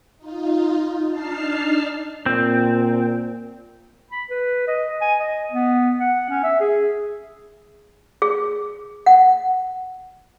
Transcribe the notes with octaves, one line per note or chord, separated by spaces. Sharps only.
D#4 F4
D4 D#4 A5 F6 C7
A#2 C4
B5
B4
D#5
G#5
D#5
B3
F#5
C#4
E5
G#4
G#4
F#5